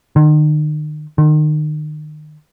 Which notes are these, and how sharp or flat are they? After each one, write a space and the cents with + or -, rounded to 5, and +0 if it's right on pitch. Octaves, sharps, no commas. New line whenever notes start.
D#3 -40
D#3 -35